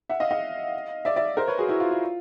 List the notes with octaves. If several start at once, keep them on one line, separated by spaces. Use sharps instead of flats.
E5 F#5
D#5 F5
D#5 F5
D5 E5
D5 E5
A#4 C5
B4 C#5
F#4 G#4
E4 F#4
F4
F4